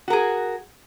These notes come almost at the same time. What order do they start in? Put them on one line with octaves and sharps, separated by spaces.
F#4 A#4 G#4